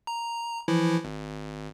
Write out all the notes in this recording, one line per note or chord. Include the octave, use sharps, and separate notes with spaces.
A#5
E3 F3 E4
G#1